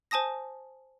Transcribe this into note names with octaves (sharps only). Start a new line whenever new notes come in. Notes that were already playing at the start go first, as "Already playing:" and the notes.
C5 G#5 A5 D#6 A#6